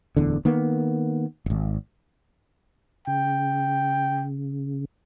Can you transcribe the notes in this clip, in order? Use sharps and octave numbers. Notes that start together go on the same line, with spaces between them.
D1 E2 D3
D#3 A#3 B3
D#1 G#1
C#3 G5